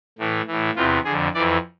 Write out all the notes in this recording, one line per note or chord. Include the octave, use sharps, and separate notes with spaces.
A2 E3
A2 E3
E2 C3 E3 F4
D3 G#4
F2
F2 E3 D5